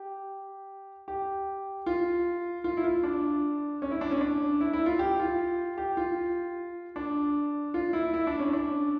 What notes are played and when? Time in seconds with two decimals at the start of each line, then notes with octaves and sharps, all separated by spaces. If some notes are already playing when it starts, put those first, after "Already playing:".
Already playing: G4
1.08 G4
1.86 F4
2.64 F4
2.77 E4
2.84 F4
3.04 D4
3.82 C#4
3.91 E4
4.01 D4
4.11 C#4
4.21 D4
4.61 E4
4.73 E4
4.86 F4
4.99 G4
5.20 F4
5.78 G4
5.97 F4
6.96 D4
7.74 F4
7.93 E4
8.14 E4
8.27 D4
8.40 C#4
8.53 D4